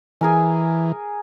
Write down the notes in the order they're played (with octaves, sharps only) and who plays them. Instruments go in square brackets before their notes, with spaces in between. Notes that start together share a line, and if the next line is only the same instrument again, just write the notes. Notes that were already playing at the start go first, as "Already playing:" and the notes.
[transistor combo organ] E3 [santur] G#4 A#4 G#5